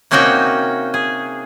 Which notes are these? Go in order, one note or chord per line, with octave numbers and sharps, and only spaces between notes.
C3 A#3 C#4 D#4 F#4 G5
G#4